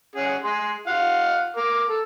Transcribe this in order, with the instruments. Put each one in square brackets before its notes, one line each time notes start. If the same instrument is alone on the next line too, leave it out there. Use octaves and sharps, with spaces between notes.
[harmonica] C#4 G#4 F#5
G#4 C6
F4 F5 F#5
A#4 D6
A4